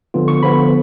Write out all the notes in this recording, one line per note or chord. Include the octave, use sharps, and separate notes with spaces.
D3 F3 B3 F4
C#6
D3 F3 B3 F4 B5